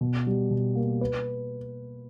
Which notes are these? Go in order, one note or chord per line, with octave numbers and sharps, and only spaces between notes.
B2
G3
B2
A#3
B4